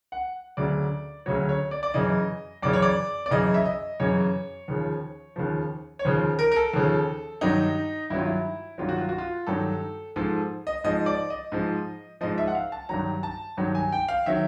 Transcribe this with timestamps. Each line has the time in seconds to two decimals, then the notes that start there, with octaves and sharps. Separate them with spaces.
0.12 F#5
0.57 D2 C#3 F#3 D5
1.26 D2 C#3 F#3 C#5
1.49 C#5
1.71 D5
1.83 D5
1.94 F#2 C#3 E3 D#5
2.62 F#2 C#3 E3 D5
2.73 C#5
2.82 D5
3.26 D5
3.31 F#2 C#3 E3 D#5
3.54 E5
3.65 D#5
4.00 F#2 C#3 E3 C#5
4.68 D#2 C#3 F3
5.36 D#2 C#3 F3
5.99 C#5
6.05 D#2 C#3 F3 C5
6.39 A#4
6.52 A#4
6.56 A4
6.74 D#2 C#3 F3
7.41 G2 D#3 F#3 D#4
8.10 G2 D#3 F#3 E4
8.19 F4
8.25 E4
8.78 G2 D#3 F#3 F4
8.89 F#4
8.98 F4
9.09 F#4
9.18 F4
9.47 G2 D#3 F#3 A4
10.16 G#2 F3 A4
10.67 D#5
10.84 G#2 F3 D#5
11.06 D5
11.30 D#5
11.52 G#2 F3
12.21 G#2 F3 D#5
12.38 E5
12.48 F#5
12.55 F5
12.72 A5
12.89 G2 D#3 F#3 A#5
13.23 A5
13.57 G2 D#3 F#3
13.75 G#5
13.92 G5
14.08 F5
14.26 D#3 F#3 E5